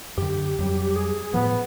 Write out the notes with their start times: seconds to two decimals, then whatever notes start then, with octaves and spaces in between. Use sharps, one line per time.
0.18 F#2 D3 G4
0.58 F2 F#3 G3
0.96 G#4
1.34 A2 F3 B3